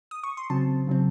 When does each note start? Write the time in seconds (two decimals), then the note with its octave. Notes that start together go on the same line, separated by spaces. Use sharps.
0.11 D#6
0.24 C#6
0.37 C6
0.50 C#3 F#3 C4 A5
0.87 C#3 F#3 C4